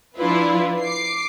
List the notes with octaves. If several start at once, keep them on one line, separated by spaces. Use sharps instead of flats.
F3 D4 E4 F4 B4
D6 C7